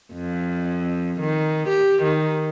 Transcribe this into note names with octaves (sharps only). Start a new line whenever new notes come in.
F2
D#3
G4
D#3